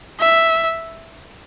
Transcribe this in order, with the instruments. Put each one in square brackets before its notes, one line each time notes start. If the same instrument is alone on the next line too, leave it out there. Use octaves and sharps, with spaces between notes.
[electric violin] E5